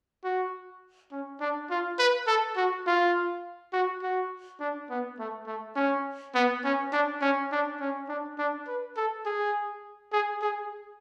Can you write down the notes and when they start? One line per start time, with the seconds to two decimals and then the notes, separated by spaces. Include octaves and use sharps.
0.24 F#4
1.12 C#4
1.40 D4
1.70 F4
1.99 B4
2.27 A4
2.56 F#4
2.86 F4
3.73 F#4
4.02 F#4
4.60 D4
4.90 B3
5.19 A3
5.47 A3
5.76 C#4
6.35 B3
6.64 C#4
6.92 D4
7.21 C#4
7.52 D4
7.81 C#4
8.08 D4
8.38 D4
8.68 B4
8.97 A4
9.25 G#4
10.12 G#4
10.42 G#4